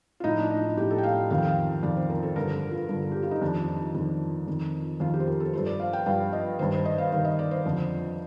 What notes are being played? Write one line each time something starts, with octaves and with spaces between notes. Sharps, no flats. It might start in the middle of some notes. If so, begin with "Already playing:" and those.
F4
A2 F3 D#4
D4
D#4
A2 F3 G4
A4
G5
F5
F2 D#3 F5
G5
F5
F2 D#3 D5
C5
A#4
A4
G2 D3 F3 A#4
A4
F4
G2 D3 F3 F4
A4
G4
F4
D#4
F2 D#3 D4
D4
D#4
F2 D#3
F2 D#3
F2 D#3 F4
G4
C5
A#4
A4
G2 F3 C5
D5
F5
G5
G2 F3 F5
D#5
G2 D#3 C5
C5
D#5
F5
G2 D#3 F5
D#5
D5
C5
F2 D3 F3